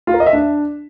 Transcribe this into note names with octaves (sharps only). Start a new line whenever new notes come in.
F4
A#4
D#5
E5
D4